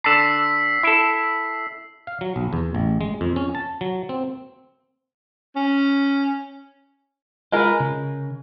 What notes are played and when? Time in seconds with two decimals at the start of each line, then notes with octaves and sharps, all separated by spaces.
0.04 D3 A5 E6 B6 C7
0.83 E4 A4
2.07 F5
2.21 F#3
2.36 B1
2.53 E2
2.75 A1
3.01 G#3
3.21 F2
3.36 C#4
3.55 A5
3.81 F#3
4.09 C4
5.56 C#4
7.52 G#3 F4 G#4 A#4 B4
7.80 C#3